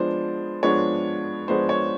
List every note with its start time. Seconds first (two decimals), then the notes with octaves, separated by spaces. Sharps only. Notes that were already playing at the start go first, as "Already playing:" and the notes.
Already playing: F3 G#3 B3 D4 C5
0.63 F3 G#3 B3 D4 C#5
1.48 F3 G#3 B3 D4 C5
1.69 C#5